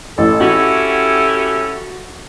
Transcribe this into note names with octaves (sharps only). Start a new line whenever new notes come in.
A1 A4
C#4 E4 F#4 G4